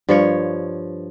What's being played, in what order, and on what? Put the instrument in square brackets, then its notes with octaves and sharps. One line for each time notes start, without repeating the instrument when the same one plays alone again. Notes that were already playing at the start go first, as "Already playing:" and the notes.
[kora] G2 F3 C#5